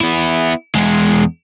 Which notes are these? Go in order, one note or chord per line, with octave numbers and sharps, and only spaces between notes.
B3 E4
E2 G#3